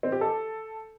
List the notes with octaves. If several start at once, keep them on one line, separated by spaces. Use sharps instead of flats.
C4
G4
A4